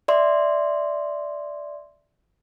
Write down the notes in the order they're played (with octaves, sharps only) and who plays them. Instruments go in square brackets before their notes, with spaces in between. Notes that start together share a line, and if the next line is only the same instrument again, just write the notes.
[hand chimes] D5 E5 C6